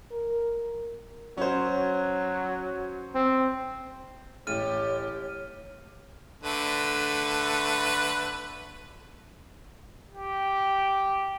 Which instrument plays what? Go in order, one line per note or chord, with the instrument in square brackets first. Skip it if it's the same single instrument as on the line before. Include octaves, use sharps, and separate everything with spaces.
[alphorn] A#4
[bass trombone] F#3 [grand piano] C#4 C5
[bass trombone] C4
[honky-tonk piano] A1 [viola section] G4 [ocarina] C#5 [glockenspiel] F6 D#7
[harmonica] D3 A3 B4
[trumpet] G4